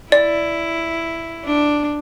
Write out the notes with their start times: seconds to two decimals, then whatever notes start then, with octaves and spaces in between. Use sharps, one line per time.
0.12 E4 D5
1.45 D4